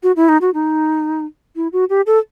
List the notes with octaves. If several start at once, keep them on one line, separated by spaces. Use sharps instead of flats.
F#4
E4
D#4
F#4
D#4
E4
F#4
G4
A4